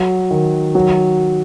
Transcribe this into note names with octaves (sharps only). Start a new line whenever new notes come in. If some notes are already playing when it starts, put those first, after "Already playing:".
Already playing: F#3
D#3
F#3